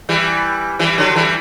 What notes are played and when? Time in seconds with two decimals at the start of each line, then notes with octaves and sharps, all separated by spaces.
0.09 E3 G3
0.79 E3 G3
0.98 D3 F#3
1.15 E3 G3